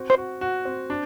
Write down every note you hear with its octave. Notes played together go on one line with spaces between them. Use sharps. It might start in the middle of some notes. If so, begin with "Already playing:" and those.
Already playing: C4 F#4
C5
F#4
F#4
C4
D4